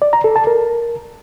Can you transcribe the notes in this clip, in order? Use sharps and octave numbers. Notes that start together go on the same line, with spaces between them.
D5
A#5
A4
A5
A#4